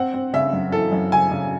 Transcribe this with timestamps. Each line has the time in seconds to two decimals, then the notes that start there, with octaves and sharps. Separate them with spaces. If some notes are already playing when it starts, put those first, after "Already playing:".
Already playing: C4 F#5
0.14 C4
0.33 C#3 E5
0.53 F#2
0.72 E3 A4
0.92 F#2
1.12 C#3 G#5
1.31 C#3